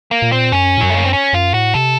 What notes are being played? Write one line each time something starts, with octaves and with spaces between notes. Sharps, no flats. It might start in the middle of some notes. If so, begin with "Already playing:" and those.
A#3
A#2
C4
F#2 C#4
A2
F#2 F#3
A3
A#3
C4
C#4
F#2 F4
A2 F#4
C3 A4